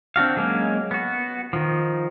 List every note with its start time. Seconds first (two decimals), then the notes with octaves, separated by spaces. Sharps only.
0.16 C4 D4 F#4 F5
0.37 F#3 G#3 A#3 C#4
0.91 B3 F#4
1.53 D#3 F3